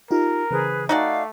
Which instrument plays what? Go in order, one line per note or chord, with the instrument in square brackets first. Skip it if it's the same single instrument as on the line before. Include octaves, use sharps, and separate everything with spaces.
[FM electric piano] D#4 F4 G4 [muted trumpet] A#4
[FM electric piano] C#3 E3 C5 [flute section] G#4 B4
[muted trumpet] A3 [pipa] D#4 F#4 D5 [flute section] F5 [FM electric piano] G5 G#5